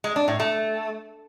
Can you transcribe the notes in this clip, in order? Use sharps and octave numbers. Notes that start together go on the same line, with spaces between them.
G#3
D4
A2
A3